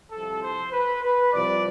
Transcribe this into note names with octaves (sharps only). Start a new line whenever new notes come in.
C2 C3 F3 A4
C5
B4
B4
C2 C3 F3 D5